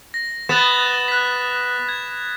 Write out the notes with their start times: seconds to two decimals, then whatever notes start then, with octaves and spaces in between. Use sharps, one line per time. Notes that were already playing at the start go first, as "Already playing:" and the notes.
0.14 A#6
0.49 B3 D#6 A6 E7
1.08 F#6 B6
1.89 G#6